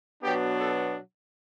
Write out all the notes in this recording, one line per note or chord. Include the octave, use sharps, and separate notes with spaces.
B2 F#3 B3 D4 G4
A4